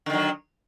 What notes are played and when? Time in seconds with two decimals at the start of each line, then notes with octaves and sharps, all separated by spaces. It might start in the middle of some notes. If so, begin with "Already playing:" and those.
0.06 D3
0.10 D#3
0.13 F#3